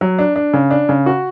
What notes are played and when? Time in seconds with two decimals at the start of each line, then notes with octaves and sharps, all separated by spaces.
0.01 F#3
0.19 D4
0.36 D4
0.53 C#3
0.71 D4
0.89 C#3
1.06 F#4